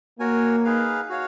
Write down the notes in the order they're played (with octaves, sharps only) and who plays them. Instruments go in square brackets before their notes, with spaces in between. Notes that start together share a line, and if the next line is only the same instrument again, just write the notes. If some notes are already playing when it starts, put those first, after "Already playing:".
[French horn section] A#3 [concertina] F#4 A#4 C#5 G#5
[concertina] D#4 G#4 B4 F5
F#4 C#5 F5